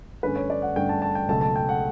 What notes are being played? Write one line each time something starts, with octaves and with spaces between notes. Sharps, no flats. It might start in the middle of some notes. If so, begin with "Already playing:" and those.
G2 D3 A3 C#4 B4
C#5
D5
F#5
G2 D3 A3 C#4 G5
A5
A5
G5
C#2 B2 F#3 A3 A5
A5
G5
F#5